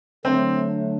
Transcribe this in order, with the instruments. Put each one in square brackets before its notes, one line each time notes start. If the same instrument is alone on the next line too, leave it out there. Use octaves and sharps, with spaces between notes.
[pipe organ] D3 F#3 A3 D4 [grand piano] C4